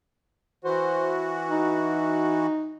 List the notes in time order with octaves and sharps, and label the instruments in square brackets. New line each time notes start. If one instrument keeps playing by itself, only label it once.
[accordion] E3 F#4 [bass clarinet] C5
[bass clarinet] D#4